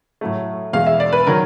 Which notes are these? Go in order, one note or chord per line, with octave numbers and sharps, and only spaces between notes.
A2 F#3 A3
E2 B2 G#3 F5
E5
D5
B4
D#3 F#3 A#4